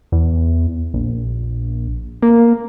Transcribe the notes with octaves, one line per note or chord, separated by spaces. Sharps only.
E2
A#1
A#3